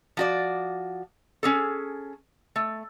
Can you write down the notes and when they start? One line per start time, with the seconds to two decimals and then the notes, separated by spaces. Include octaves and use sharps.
0.17 F3 F#4 D5
1.43 C#4 G#4 A4
2.56 A3